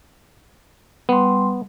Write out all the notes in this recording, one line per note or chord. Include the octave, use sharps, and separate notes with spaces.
G3 B3 C6